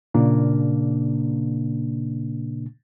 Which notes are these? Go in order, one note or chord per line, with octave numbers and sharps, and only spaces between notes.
A#2 C#3 A#3 D4